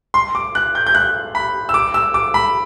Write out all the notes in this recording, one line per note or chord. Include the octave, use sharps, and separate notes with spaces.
C6
D6
F#6
G6
G6
F#6
B5
E6
D6
E6
D6
B5